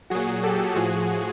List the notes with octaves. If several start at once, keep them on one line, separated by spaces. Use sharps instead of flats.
A#2 F#3 F#4 G#4
G4 A4
A2 F3 F#4 G#4